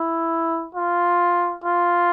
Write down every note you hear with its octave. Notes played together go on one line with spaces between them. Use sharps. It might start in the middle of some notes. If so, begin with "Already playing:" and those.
Already playing: E4
F4
F4